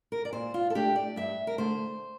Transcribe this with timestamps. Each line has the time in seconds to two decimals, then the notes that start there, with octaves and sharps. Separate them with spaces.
0.12 A#4
0.25 D5
0.33 A#2 C5
0.54 F4
0.70 A4
0.75 A3 D4 G4
0.96 D5
1.16 G2 E5
1.47 A#4
1.58 D3 A3 C5